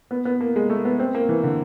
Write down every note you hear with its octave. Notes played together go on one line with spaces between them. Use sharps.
B3
B3
A#3
G#3
A3
B3
C4
A#3
E3
D3